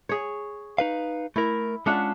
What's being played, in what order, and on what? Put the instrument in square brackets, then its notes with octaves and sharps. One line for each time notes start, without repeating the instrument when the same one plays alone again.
[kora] G#4 C#5
[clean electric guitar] D#4 B4 F5
[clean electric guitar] A3 A#4 [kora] E4
[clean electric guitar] G#3 C#4 F4 [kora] D4 E5 F#5